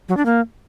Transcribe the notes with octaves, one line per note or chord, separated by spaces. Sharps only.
F#3
D4
A#3